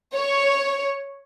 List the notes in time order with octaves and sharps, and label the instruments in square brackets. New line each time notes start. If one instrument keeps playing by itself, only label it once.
[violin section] C#5